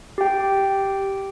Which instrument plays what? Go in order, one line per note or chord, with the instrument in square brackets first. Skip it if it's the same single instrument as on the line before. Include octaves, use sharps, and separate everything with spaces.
[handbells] G4 G5